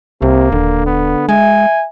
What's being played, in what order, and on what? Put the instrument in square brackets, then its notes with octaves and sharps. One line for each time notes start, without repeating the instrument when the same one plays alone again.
[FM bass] C2 [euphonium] C3 [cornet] A#3
[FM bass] D#1 [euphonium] D3
[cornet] B3
[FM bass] G#3 [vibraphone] E5 [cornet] G#5